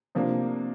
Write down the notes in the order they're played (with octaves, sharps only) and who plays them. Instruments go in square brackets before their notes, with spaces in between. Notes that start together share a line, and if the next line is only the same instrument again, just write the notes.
[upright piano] C3 F3 A#3 D4